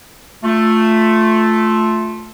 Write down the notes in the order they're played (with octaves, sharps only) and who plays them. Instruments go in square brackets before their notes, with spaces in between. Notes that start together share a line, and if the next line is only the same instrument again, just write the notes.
[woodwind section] A3 F4